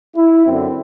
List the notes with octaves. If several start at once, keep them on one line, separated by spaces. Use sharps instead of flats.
E4
F#2 D3 C4